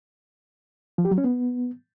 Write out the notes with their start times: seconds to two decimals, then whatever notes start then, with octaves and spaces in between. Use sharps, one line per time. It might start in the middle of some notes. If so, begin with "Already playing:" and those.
0.98 F3
1.05 G4
1.11 F#3
1.18 C#4
1.24 B3